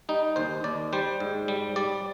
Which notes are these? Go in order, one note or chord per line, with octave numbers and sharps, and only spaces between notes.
G3 D#4
D#2 C5
D#2 D5
G3 C5
G#2
G3
G3 D5